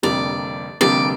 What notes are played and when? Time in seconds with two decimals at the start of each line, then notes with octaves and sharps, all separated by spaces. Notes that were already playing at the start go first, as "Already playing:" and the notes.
0.03 F1 F2 D3 G3 A#3 D5
0.81 F1 F2 D3 G3 A#3 D5